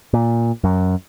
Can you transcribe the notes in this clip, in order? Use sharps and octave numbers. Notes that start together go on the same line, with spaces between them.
A#2
F#2